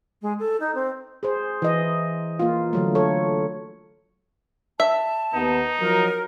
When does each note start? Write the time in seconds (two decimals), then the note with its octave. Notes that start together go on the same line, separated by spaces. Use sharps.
0.22 G#3
0.39 A4
0.60 D#4
0.75 C4
1.23 G#4 C5
1.62 E3 D#5
2.39 A#3 F4
2.73 D3 F#3 A3
2.95 A4 C#5
4.80 E5 A5
5.34 D#2 B3 D#4
5.80 F3 F#3 A#4